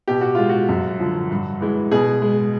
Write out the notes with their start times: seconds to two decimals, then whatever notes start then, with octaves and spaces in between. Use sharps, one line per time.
0.08 B2 G4
0.21 F#4
0.35 G#3 F4
0.49 F#4
0.69 F#2
1.00 D3 F3
1.31 G2
1.60 E3 G#3
1.91 B2 G#4
2.22 G#3